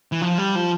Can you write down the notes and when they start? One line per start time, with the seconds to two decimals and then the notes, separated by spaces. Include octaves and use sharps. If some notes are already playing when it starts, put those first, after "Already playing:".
0.12 E3
0.21 F3
0.38 G3
0.55 F3